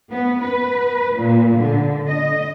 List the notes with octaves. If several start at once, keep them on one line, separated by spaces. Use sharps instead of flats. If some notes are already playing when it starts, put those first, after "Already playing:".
B3
B4
A#2
D3
D#5